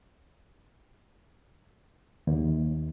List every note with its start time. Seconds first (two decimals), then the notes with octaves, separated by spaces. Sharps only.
2.27 D#2